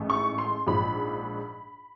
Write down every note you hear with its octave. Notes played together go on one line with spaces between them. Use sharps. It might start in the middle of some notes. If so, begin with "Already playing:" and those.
Already playing: A1 G#2 E3 A3
C#6
C6
A#1 G#2 F3 B5